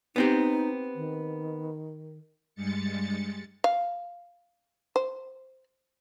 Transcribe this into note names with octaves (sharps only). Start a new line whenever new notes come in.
B3 C4 D#4 G4
D#3
G2 G3 G#3 A6 C#7
F5
C5